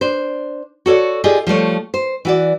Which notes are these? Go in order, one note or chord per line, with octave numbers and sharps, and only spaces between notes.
D4 C5
F#4 A4 C#5 D5
F4 G4 G#4 D5 D#5
F3 G3 A3 C#5
C5
E3 F#4 D5